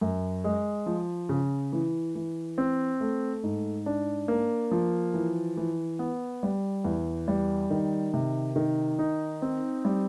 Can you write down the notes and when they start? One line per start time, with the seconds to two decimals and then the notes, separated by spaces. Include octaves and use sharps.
0.01 F#2
0.44 G#3
0.86 F3
1.29 C#3
1.72 E3
2.15 E3
2.58 C4
3.00 A3
3.43 G#2
3.86 D4
4.28 A#3
4.71 F3
5.14 E3
5.57 E3
5.99 B3
6.43 G3
6.84 E2
7.28 G3
7.70 D#3
8.14 C3
8.56 D#3
8.99 D#4
9.42 C4
9.85 G3